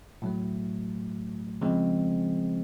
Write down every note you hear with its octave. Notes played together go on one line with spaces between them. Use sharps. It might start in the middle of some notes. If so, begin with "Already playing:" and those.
A2 F#3 A3
C#3 F3 G#3 C4